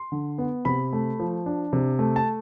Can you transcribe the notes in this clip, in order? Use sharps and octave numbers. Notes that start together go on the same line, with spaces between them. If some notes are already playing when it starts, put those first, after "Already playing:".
Already playing: C6
D3
B3
C3 B5
A3
F3
D4
C3
A3
A5